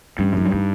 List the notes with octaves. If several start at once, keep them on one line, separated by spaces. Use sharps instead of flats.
G2 C#4
F#2 D#4
G2
D#4